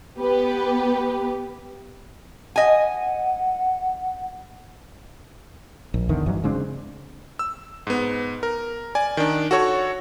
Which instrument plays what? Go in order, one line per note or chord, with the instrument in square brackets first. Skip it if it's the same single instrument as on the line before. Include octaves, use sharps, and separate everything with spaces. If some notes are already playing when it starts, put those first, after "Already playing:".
[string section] B3 G4 B4
[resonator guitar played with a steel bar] D#5 G#5 [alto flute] F#5
[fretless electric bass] A#1
E2 D3 D#3
F#1 G2 E3 F#3
C#3 G#3 C4 D4
[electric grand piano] E6
G#2 B3
A#4
D5 G#5
D#3 D4
F#4 A4 C#5 C#6